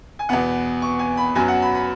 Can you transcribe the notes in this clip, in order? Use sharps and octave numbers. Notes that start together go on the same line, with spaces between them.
G#5
E2 B2 B3 F#5
C#6
G#5
B5
F#2 F#3 B3 G#5
F#5
B5
B5